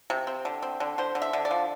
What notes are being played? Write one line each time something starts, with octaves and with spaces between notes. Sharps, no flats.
C3
C4
D3
C4
D3
D3 C5
D3
E5
D3
D5
F3